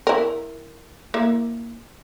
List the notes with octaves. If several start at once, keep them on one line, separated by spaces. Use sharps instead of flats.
E4 A#4
A#3 E4